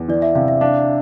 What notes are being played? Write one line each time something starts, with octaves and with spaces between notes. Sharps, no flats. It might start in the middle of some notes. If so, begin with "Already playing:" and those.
Already playing: E2
E3 D5
E5
C3 F5
E5
D4 F5